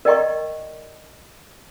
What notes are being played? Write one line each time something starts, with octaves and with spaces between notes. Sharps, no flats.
A#4 D5 D#5 G5 A#5 C#6